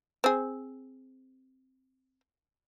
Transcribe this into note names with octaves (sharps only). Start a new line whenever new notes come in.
C4 G#4